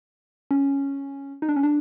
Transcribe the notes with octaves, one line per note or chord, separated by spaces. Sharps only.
C#4
D#4
D4
C#4
D4